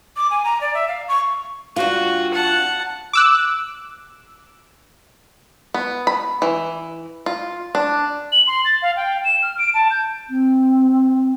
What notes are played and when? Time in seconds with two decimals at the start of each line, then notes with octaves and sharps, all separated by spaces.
0.17 D6
0.31 G#5
0.44 A#5
0.61 D5
0.74 E5
0.88 F5
1.08 C#6
1.76 G2 F4 F#4
2.34 F#5 A5
3.13 D6 E6 F#6
5.74 B3
6.07 B5
6.42 E3
7.26 F4
7.75 D4
8.32 F#7
8.47 C6
8.65 A6
8.82 F5
8.96 G5
9.25 E7
9.42 F6
9.59 D7
9.74 A5
9.91 G6
10.30 C4